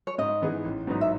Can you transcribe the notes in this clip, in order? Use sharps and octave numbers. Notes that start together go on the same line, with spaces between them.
C#5
G#2 D#5
E3 B3 D#4 G#4
A1
G#2 F#3 B3 D#4
E5